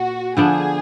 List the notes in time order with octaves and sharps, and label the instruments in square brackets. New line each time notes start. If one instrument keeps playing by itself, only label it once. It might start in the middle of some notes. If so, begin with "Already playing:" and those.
Already playing: [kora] A#2 [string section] F#4
[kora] D3 F3 B3 D4 [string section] G#4